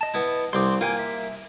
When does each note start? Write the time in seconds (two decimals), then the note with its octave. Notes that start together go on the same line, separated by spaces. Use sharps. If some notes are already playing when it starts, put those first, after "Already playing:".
0.01 D#5 A5
0.14 B3 E4
0.53 C2 C4 C6 D6
0.81 A#3 F4 G5 G#5
0.99 E5